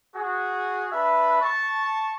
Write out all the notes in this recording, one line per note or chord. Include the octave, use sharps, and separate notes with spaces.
F#4 G#4
D4 B4 E5 B5
A5 C#6